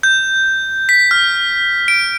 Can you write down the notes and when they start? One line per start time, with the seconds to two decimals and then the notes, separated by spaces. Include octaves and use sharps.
0.03 G6
0.89 B6
1.11 F6
1.88 D7